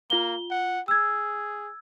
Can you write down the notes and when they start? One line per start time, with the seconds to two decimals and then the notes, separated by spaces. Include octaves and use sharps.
0.10 A#3 F4 G7
0.50 F#5
0.88 G#4 E6 G#6